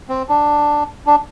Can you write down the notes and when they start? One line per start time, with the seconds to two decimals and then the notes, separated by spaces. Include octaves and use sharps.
0.09 C4
0.29 D4
1.06 D4